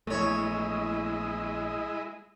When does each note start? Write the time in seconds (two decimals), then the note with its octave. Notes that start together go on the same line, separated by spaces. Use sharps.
0.07 A#1 E2 G#3 A3 E4 C#5 D#5